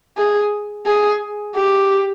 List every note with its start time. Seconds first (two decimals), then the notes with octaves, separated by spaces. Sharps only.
0.17 G#4
0.86 G#4
1.55 G4